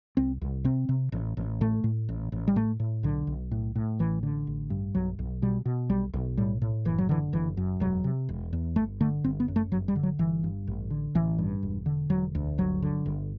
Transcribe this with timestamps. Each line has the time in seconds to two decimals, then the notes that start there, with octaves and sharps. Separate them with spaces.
0.17 C2 C4
0.41 C2
0.64 C3 C4
0.89 C3
1.12 A1
1.37 A1
1.61 A2 A3
1.84 A2
2.09 A1
2.32 A1
2.48 G3
2.56 A2 A3
2.80 A2
3.03 B1 D3
3.27 B1
3.51 A2
3.75 A2
3.99 A1 E3
4.23 D3
4.47 A1
4.70 G2
4.95 B1 F#3
5.19 B1
5.42 B2 G3
5.65 B2
5.89 B1 G3
6.13 B1
6.37 A2 G3
6.62 A2
6.85 F#1 E3
6.98 F#3
7.09 D3 E3
7.33 F#1 E3
7.57 F#2
7.80 E1 F#3
8.04 C3
8.29 E1
8.53 E2
8.76 G1 A3
9.01 D3 A3
9.24 G1 C4
9.40 B3
9.48 F#2
9.56 A3
9.71 G1 F#3
9.88 G3
9.96 D3
10.03 F#3
10.19 G1 E3
10.44 G2
10.67 A1
10.90 D3
11.15 A1 E3
11.38 G2
11.63 E1
11.86 D3
12.10 E1 F#3
12.35 D2
12.58 G1 F#3
12.82 D3
13.06 G1